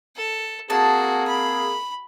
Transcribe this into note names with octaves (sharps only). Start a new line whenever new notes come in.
A4
A#3 C4 F#4 G#4 A5
B5